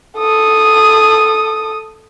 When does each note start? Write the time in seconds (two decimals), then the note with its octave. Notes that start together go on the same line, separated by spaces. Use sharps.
0.17 A4 D#6